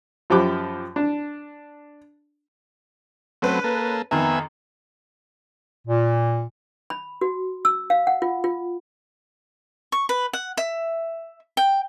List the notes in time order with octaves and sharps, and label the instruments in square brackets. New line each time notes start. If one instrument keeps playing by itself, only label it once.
[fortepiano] F#2 F3 G4 B5 D6 F#6
D4
[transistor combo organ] F#3 A3 C4 [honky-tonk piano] C#4 B4
[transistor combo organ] A#3 A4
[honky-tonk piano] F2 D#3 A#5 [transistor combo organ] B3 E5 G#5
[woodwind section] A#2
[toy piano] B5
F#4
E6
F5
F#5
F4
F4
[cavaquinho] C#6
B4
F#5
E5
G5